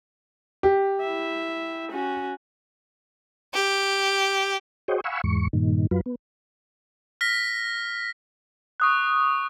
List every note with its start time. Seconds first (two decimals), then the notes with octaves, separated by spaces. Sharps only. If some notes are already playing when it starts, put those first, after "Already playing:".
0.63 G4
1.01 E4 E5
1.91 C#4 F#4
3.54 G4
4.88 F#4 G#4 C5 C#5 D#5 G5
5.04 F5 F#5 G#5 B5 C#6 E6
5.24 E2 G#2 C#6
5.53 G2 A#2 D#3
5.91 F#2 F#3 F4 B4
6.06 B3
7.21 F6 A#6 B6
8.80 C#6 D#6 F#6